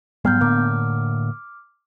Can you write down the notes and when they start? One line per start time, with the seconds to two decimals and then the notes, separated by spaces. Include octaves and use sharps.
0.25 G#2 F#3 G3 B3 F6 G6
0.41 A2 D3 A#3 D6 F6